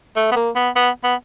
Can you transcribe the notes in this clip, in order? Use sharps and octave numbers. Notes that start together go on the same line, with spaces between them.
A3
B3
A#3
B3
B3
B3